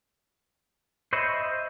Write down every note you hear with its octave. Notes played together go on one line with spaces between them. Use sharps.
C5 C#5 D#5 E5 B5